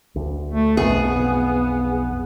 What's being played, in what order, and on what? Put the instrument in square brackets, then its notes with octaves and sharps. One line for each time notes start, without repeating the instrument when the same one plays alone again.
[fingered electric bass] D2
[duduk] A3
[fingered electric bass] B1 F2 [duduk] B3 [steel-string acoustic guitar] G#4